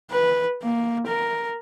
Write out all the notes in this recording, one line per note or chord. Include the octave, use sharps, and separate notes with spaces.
B4
A#3
A#4